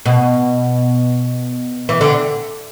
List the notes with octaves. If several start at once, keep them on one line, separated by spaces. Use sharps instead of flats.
B2
E3
D3